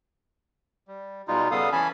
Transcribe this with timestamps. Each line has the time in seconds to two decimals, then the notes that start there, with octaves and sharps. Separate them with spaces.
0.88 G3
1.28 B2 G3 G#3 D#4 F4
1.51 C#3 G3 B3 A4 F5 D#6
1.72 E3 C#4 G#5 A5 B5